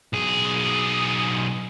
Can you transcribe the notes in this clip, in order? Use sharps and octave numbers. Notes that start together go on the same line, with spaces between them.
B1 G#4